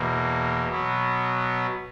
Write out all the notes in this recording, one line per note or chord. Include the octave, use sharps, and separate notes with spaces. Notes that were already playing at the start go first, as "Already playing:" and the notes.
Already playing: E2 B2 A#3
B2 F#3 B3